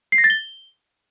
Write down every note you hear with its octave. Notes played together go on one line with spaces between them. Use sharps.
C7
A#6
A6
G7